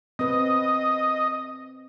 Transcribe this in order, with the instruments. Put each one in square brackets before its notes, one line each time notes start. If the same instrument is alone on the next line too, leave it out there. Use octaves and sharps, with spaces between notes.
[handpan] C4 B4 [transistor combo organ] D#5